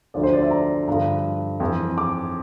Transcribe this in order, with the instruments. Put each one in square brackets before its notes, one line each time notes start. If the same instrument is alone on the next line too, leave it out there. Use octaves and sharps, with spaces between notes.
[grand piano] D2 D3 F3 D5
C5
D5
E5
A#5
G2 D3 F3 A#5
F2 E3
D6